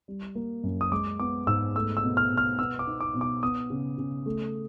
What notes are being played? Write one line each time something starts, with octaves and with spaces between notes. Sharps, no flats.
G3
A#3
F#2
D#6
G#3 D6
B3 D6
G#2 E6
A3 E6
E6
B2
F6
B2
F6
B3 E6
D6
D#4
D6
B2
D6
B3 D#6
C#3
C#3
A3